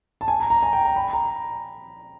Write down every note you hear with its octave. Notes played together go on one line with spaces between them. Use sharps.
A5
G#5
A#5
A#5
G#5
G5
A#5
B5
A#5